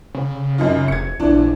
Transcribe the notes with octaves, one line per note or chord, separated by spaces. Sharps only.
C#3
F#2 D#4 F4
F1 G#6 C#7
A#1 E3 D4